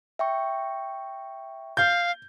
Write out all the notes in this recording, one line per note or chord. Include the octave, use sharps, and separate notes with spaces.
E5 G5 C#6
F5 G6